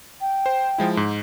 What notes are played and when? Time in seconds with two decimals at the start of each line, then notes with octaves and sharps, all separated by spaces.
0.21 G5
0.46 C5
0.78 F3 G#3 E4
0.97 G#2